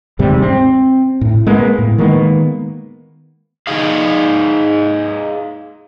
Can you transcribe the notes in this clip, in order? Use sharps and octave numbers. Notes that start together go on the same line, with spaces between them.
D#2 G#2 C3 G3
C4
A2
G#3 A#3 B3
A2
D#3 G#3 A#3 B3
D#4 G#4 F5